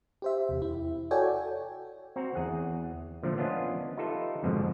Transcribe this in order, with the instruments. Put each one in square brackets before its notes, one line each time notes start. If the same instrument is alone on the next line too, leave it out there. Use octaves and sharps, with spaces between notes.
[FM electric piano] G4 C5 E5
E2 C3
E4
F#4 A4 C#5 D5 G5 G#5
[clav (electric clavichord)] C4 F#4 A#5
E2 G#4 F#5
A#2 D3 F3 A3
B3 C#4 D4 F4 D#5
D#4 F4 G4 A4 B4 E5
F2 G#2 B2 D3 F3